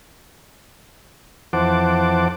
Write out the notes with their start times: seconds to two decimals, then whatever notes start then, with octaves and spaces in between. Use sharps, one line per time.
1.53 F2 E3 C5 F#5 A5 D6